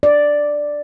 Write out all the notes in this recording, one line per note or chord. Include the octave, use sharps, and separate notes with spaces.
D5